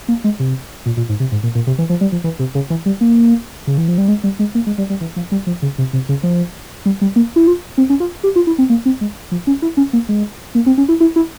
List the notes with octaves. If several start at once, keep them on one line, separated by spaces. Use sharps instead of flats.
A#3
G#3
C3
A#2
A#2
G#2
C3
G#2
A#2
A#2
C3
E3
F3
G3
F3
E3
C3
C#3
E3
G3
A#3
C#3
E3
F3
G3
G#3
G3
G#3
A#3
G#3
G3
G3
E3
F3
G3
F3
C#3
C3
C3
C#3
F3
G3
G3
A#3
E4
F4
C4
C#4
F4
G4
F4
E4
C4
A#3
C4
G#3
F3
C#4
E4
C#4
A#3
G#3
A#3
C4
C#4
E4
E4
E4